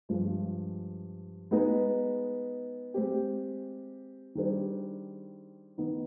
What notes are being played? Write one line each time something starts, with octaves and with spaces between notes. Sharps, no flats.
G2 F3 G#3
G#3 B3 D#4 G#4 B4
G#3 C4 G4
D#3 G3 D4 G#4 C5
D#3 B3 D#4